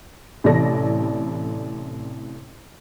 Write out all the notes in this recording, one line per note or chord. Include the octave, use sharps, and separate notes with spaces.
A1 C3 E3 A4 D5 A#6